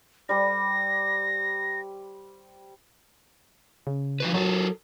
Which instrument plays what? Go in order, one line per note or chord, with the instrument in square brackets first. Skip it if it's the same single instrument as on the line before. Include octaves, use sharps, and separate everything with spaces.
[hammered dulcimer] G3 C5 [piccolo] A#6
[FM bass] C#3
[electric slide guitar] F3 F#4 B4
[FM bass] F#3 [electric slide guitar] F#4 A4 A#4